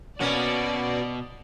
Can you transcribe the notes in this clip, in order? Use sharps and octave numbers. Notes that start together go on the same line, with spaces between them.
B2 A#3 C#4 F#4 B4 D5